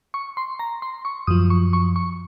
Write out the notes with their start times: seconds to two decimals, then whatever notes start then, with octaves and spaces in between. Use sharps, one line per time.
0.14 C#6
0.37 C6
0.59 A#5
0.82 C6
1.05 C#6
1.27 F#2 F3 D#6
1.50 C#6
1.73 C#6
1.96 C#6